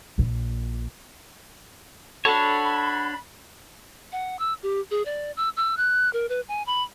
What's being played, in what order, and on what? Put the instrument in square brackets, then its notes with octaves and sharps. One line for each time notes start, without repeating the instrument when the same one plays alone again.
[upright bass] A#1 A#2
[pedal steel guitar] D4 C#5 [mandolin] F#4 A4 A5 [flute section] B5
[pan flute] F#5
E6
G4
G#4
D5
E6
E6
F#6
A#4
B4
G#5
B5